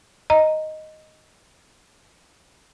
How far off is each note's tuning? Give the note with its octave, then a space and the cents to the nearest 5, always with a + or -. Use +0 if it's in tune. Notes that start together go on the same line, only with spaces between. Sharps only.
D#5 +0 A#5 +0